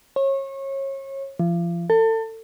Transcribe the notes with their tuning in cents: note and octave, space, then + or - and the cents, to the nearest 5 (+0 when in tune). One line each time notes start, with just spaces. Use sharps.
C#5 -30
F3 -35
A4 +30